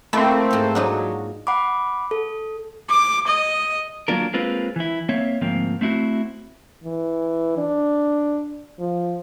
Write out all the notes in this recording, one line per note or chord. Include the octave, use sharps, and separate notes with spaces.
A3 A#3 C4 E4
G#2 F5
F#3 D4 D#4 F4
F#5 B5 D6
A4
D6
D#5
F#3 G#3 A#3 D4 F4 A#4
G#3 A#3 C4 F4 B4
E3 E4
A#3 C4 C#5 E5
D2 G#2 F3 A#3 C4
A3 C4 E4 F#4
E3
D4
F3